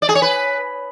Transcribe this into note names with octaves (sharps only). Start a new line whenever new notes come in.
D5
G#4
C#5
B4